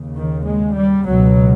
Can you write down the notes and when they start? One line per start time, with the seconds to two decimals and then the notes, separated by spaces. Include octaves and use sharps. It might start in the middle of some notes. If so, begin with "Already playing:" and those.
Already playing: D#2 C#3
0.15 D#3
0.46 G#3
0.76 G3
1.06 C#2 B2 F#3